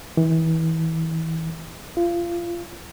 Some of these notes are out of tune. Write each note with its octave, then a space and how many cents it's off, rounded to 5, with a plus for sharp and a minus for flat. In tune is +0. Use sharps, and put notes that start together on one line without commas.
E3 -30
F4 -25